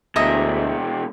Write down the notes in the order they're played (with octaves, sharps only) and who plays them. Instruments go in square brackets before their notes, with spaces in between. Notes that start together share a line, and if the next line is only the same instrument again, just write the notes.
[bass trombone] D2 [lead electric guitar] B2 G#3 [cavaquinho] D#5 E5 A#5